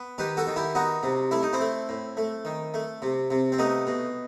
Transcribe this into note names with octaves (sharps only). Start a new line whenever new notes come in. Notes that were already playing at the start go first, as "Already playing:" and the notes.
Already playing: B3
D#3 G4 B4
F#4 A4
D#3
E4 G4
B3 D#4 F#4
C3
A3 E4
D#4
C4 E4
A3
A2
A3
D#3
A3
C3
C3
C4
A3 B3 D#4
B2